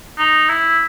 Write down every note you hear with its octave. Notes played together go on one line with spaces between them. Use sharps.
D#4
E4